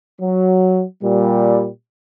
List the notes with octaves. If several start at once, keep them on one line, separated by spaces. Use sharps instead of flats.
F#3
A#2 G3